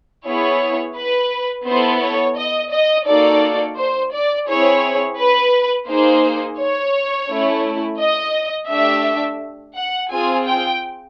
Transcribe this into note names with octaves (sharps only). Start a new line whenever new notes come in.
B3 E4 G#4 C#5
B4
B3 E4 A4 C5
C#5
D#5
D#5
A#3 D#4 F#4 A4 D5
C5
D5
C4 E4 G#4 C#5
B4
A#3 D#4 G#4 C5
C#5
A3 C#4 E4
D#5
A3 D4 G4 E5
F#5
C4 F4 G#4 G#5
G5